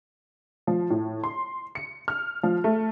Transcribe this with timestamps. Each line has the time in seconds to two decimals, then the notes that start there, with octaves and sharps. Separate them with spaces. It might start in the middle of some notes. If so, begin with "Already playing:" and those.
0.67 F3
0.90 A2
1.24 C6
1.75 C#7
2.08 F6
2.43 F3
2.64 A3